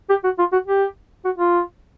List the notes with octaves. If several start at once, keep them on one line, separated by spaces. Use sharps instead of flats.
G4
F#4
F4
F#4
G4
F#4
F4